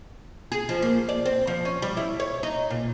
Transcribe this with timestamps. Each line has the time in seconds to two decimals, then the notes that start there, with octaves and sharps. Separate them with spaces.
0.52 G#4
0.69 F3
0.82 A#3
1.09 D5
1.26 C4
1.47 F3
1.65 C#4
1.82 G3
1.97 E4
2.20 C#5
2.43 D#4
2.70 A#2